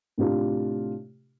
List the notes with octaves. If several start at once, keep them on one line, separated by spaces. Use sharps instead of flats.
A2 C3 D4 F4 G4